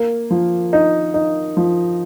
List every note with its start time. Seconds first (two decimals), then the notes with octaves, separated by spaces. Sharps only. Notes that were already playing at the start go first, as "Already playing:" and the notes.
Already playing: A#3
0.31 F3
0.73 D#4
1.14 D#4
1.57 F3